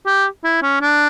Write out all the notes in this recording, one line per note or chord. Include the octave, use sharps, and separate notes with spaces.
G4
E4
C#4
D4